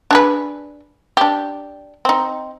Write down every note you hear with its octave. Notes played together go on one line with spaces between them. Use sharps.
D4 G#4 B4
D4 G4
C4 D#4